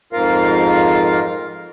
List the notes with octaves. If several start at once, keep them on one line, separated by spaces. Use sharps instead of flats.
F2 G#2 F4 A#4 F5